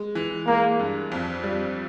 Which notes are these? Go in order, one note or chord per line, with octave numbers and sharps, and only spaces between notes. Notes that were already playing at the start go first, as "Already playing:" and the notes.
Already playing: G#3
E3
G#3 A#3
G2
F2
G3